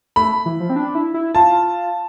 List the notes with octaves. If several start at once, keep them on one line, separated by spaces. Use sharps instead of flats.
A3 B5
E3
F3
C4
D4
E4
E4
F4 A5